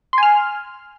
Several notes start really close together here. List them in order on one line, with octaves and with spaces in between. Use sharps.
C6 G#5 F6